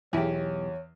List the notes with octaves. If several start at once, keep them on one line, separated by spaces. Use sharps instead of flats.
B1 E2 E4 G4 G#4 C#5